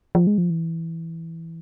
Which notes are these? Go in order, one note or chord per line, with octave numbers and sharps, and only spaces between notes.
F3
G#3
F3
E3